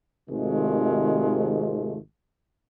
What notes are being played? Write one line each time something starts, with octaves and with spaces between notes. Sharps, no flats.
G#1 C3 D#3 G#3 A3 F4